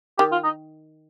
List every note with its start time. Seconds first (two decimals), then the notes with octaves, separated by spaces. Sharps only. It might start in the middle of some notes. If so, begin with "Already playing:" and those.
0.18 D#3 G4
0.32 F4
0.44 D#4